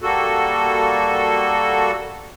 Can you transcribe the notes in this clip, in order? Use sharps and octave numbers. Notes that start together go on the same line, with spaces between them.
G3 A#3 F#4 A4